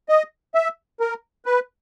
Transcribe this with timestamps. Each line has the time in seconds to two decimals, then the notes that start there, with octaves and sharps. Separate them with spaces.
0.09 D#5
0.55 E5
1.00 A#4
1.46 B4